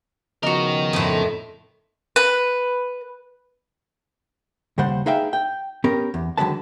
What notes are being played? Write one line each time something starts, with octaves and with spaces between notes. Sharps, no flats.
C#3 F3 B3 D#4 F#4 A#4 D#5
F2 A2
B4
D#2 C#3 G3 C5 F#5
D#4 G#4 B4 E5 F5 G5
G5
B3 C#4 G4 A#4
E2
D3 D#3 F#3 G#3 B4 A5